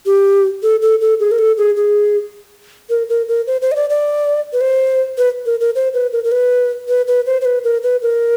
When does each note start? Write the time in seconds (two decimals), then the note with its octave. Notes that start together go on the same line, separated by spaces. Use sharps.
0.06 G4
0.63 A4
0.82 A4
1.01 A4
1.20 G#4
1.31 A#4
1.39 A4
1.58 G#4
1.77 G#4
2.90 A#4
3.09 A#4
3.28 A#4
3.47 C5
3.62 C5
3.72 D#5
3.76 D5
3.90 D5
4.53 B4
4.61 C5
5.18 B4
5.46 A#4
5.61 A#4
5.75 C5
5.94 B4
6.13 A#4
6.24 A#4
6.32 B4
6.88 B4
7.07 B4
7.26 C5
7.41 C5
7.45 B4
7.64 A#4
7.83 B4
8.02 A#4